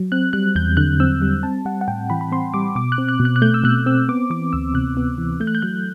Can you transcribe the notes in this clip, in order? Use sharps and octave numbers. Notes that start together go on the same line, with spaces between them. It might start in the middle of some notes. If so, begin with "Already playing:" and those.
Already playing: F#3
C4 F#6
G3 F#6
E2 G6
D3 F#6
C4 E6
G3
C4 A5
G3 F#5
F#5
A2 G5
E3 B5
B5
C4 C6
G3 D6
B2 D6
F#6
C4
F#6
B2
F#6
F#6
A3 G6
E6
B2 F#6
C4 E6
B3 D6
E3 D6
D2 E6
C3 F#6
B3
E3
A3 G6
F#6
G6
F#3 F#6